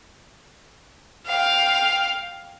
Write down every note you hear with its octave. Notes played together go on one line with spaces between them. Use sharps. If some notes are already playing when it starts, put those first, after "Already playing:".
F5 G5